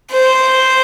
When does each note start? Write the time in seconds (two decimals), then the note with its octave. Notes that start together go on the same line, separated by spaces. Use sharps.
0.13 C5